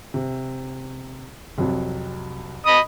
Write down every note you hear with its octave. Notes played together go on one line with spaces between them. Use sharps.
C3
C2 F2 F#3
D#5 B5 D#6